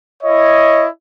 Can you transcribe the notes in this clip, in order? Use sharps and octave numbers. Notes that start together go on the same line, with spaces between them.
E4 C#5 D#5